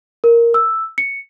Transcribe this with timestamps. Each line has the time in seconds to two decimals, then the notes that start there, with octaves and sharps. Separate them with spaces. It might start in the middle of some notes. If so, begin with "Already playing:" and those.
0.24 A#4
0.54 E6
0.98 C#7